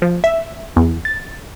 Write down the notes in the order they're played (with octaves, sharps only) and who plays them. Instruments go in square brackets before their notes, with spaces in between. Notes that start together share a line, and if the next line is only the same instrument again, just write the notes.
[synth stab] F3
E5
E2
A6